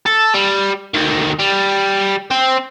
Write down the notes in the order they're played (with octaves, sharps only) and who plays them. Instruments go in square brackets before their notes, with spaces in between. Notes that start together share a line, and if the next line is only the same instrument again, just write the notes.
[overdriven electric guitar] A4
G3
D2 D#3
G3
C4